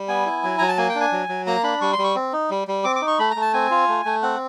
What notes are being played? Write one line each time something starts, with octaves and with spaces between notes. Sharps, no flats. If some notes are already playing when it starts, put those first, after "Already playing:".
Already playing: G3
B3 G#5
E4
F#3
F#3 A#5
A5
A#3 G#5
G5
D4
G#5
F#3
F#3
A#3 A#5
D4 B5
G3 C#6
C6
G3
C#6
C4
D#4
G3
G3
C4 D6
D6
D#4
C#6
A3 B5
A#5
A3
A5
C4 G#5
F4
A3
A3
C4 F#5